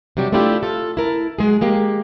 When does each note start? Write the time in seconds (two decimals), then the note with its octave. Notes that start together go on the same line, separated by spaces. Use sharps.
0.17 C3 F#3 G3 G4
0.32 A3 C4 D4 E4 F4 G4
0.63 F4 A4
0.97 E4 A#4 A5
1.39 F#3 G#3 G#4
1.61 G#3 A#3 G4